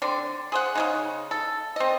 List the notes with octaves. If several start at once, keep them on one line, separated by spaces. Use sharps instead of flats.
D3 C4 D5
G#4 C5 F#5
C#3 G#3 D#4
A4
C4 D#5